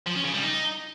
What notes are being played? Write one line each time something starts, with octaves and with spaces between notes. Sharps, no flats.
F3
C#4
C#3
G3
D#4